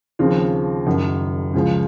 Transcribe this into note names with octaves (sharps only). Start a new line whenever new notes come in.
D#2 C#3 F3 C4
F#1 F#2 D#3
C#2 C#3 F3